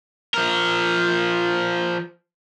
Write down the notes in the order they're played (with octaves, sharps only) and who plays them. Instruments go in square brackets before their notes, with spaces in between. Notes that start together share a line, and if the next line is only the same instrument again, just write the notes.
[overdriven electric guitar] F3 A#4